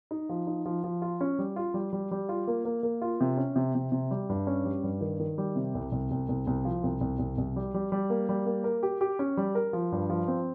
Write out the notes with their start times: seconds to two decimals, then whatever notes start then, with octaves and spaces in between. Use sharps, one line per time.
0.11 D#4
0.29 F3
0.47 D#4
0.65 F3
0.84 F3
1.02 F4
1.21 C#4
1.39 G3
1.56 F4
1.74 G3
1.93 G3
2.11 G3
2.29 F4
2.47 A#3
2.65 A#3
2.83 A#3
3.02 F4
3.21 C3
3.37 C#4
3.56 C3
3.75 C3
3.92 C3
4.11 G3
4.29 G2
4.47 C#4
4.65 G3
4.83 G2
5.01 D#3
5.20 D#3
5.38 G3
5.56 C3
5.75 C2
5.92 C2
6.11 C2
6.29 C2
6.47 C2
6.65 F3
6.83 C2
7.01 C2
7.19 C2
7.38 C2
7.56 G3
7.74 G3
7.92 G3
8.10 A#3
8.29 G3
8.46 A#3
8.64 A#4
8.83 G4
9.01 G4
9.19 C#4
9.37 G3
9.55 A#4
9.73 F3
9.92 G2
10.09 F3
10.28 C4